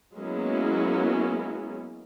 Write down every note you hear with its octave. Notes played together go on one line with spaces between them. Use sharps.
F#3 G#3 A#3 B3 C#4 E4